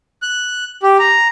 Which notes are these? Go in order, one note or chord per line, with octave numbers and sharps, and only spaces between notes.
F#6
G4
A#5